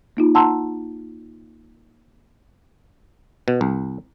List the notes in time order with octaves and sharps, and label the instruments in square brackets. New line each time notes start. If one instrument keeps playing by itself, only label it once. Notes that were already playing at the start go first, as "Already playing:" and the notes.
[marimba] A#3 D#4 F4
F#5 A5 A#5 C6 E6
[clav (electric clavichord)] B2
C2